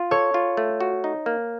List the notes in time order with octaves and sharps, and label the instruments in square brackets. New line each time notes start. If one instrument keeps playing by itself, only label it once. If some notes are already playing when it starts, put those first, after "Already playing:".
Already playing: [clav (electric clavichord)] F4
[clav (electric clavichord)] A4 [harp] C#5
[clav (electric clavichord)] F4
A3
F#4
D#4
A#3